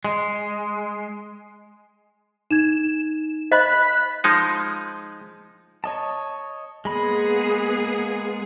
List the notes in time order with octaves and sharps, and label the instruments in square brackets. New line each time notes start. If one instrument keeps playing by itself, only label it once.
[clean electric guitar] G#3
[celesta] D#4 G#6 [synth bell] E7
[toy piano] D#5 [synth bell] B5 F#6 B6
[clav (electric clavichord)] F3 G#3 D#4
[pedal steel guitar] C#5 D#5 A5
[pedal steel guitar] G#3 B5 [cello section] A#3 B3 G#4